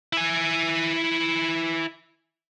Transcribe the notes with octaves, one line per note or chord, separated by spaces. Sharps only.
E4 G#5